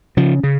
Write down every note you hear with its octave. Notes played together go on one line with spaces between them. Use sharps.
C#3 F3
C#3